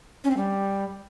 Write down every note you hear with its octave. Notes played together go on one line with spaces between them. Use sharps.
C#4
C4
G3